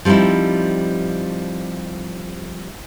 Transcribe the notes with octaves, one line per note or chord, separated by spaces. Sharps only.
F3 G3 C4 D#4 E4